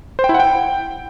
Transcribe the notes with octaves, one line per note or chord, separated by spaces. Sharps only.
C5
G5
E4
F#5
G5